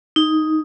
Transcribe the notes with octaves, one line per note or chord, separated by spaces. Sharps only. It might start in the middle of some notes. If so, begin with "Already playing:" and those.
D#4